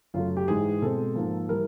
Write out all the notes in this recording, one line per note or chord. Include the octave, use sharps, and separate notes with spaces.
F#2 C#3 F#3 A3 F4
G4
G#2 E3 G#3 G#4
B2 G#3 C4 A4
G#2 F3 A#3
E3 G3 A#4